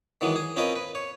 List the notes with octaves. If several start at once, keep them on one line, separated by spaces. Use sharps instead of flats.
D#3 E3 F#3 G#3 B3
G#4
C4 C#4 F4 A#4 B4 D#5
B4
C#5